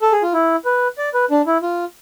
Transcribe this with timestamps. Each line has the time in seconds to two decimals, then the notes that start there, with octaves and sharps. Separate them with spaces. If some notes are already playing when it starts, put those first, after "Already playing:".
0.02 A4
0.12 G#4
0.22 F4
0.33 E4
0.65 B4
0.98 D5
1.14 B4
1.30 D4
1.46 E4
1.62 F4